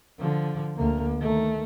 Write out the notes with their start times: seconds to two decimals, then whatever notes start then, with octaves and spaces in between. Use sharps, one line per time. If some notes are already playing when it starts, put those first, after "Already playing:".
0.19 D3 F3
0.76 D2 A#3
1.18 D#3 A3